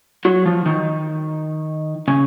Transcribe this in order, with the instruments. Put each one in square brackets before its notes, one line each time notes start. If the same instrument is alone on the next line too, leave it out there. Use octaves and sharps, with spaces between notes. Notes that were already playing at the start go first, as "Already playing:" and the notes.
[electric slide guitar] F#3 F#4
F3 F4
D#3 D#4
C#3 C#4